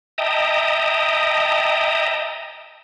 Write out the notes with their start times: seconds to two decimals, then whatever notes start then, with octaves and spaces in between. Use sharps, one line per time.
0.18 D#5 E5 G5 A5 A#5 D#6